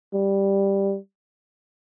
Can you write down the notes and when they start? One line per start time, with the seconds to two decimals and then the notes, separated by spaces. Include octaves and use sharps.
0.14 G3